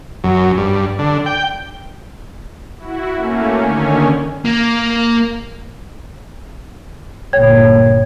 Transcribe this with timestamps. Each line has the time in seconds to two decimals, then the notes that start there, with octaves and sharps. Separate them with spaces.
0.24 F#2
0.57 G2
0.99 D3
1.26 G5
2.79 E4 F#4
3.16 A3 A#3 C#4
3.59 D3 D#3 C#4
4.45 A#3
7.33 G1 A#2 A#3 C#5 G5 G#6